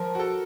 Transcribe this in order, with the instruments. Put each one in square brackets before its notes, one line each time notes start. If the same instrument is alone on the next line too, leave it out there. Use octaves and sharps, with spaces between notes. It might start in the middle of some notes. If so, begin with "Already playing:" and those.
Already playing: [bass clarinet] F3 [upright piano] A#4
[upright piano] F#4
A4